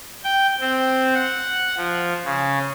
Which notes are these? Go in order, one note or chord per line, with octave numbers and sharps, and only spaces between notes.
G5
C4
F#5
F3
C#3